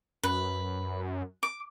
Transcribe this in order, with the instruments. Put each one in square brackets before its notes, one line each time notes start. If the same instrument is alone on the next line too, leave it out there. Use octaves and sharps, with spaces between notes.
[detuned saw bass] F#2 [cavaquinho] B4
[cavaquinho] D6